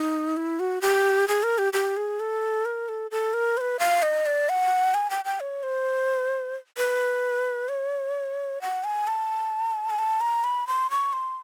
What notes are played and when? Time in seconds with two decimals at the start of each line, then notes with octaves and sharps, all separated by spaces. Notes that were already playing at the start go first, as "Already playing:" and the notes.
Already playing: D#4
0.37 E4
0.60 F#4
0.82 G4
1.28 G#4
1.43 A#4
1.58 G4
1.73 G4
1.97 G#4
2.20 A4
2.65 A#4
2.89 A4
3.11 A4
3.33 A#4
3.57 C5
3.61 B4
3.79 F5
4.02 D#5
4.26 D5
4.49 F#5
4.94 G#5
5.10 G5
5.25 G5
5.40 C#5
5.63 C5
6.77 B4
7.69 C#5
8.62 F#5
8.84 G#5
9.07 A5
9.90 G#5
9.99 A5
10.21 A#5
10.44 B5
10.67 C6
10.90 C#6
11.13 C6